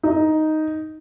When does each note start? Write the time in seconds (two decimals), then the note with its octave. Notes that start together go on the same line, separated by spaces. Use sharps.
0.03 D#4